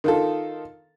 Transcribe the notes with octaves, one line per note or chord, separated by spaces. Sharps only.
D#3 F4 A4